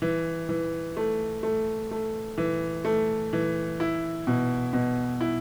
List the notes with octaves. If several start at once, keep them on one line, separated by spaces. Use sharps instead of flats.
E3
E3
A3
A3
A3
E3
A3
E3
E4
B2
B2
E4